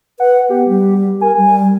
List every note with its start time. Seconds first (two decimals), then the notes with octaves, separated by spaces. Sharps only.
0.20 B4 F#5
0.50 B3 G4
0.68 G3
1.21 A#4 G#5
1.37 G3